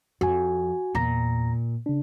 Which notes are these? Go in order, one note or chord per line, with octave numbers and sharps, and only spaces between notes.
F2 F#4 G#5
E2 A#2 A#5 A#6
C#3 D4